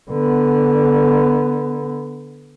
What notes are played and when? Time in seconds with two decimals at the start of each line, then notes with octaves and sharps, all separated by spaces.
0.11 D3 B3